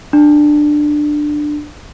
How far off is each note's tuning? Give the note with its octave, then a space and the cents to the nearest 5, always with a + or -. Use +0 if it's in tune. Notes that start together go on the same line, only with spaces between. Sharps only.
D4 +15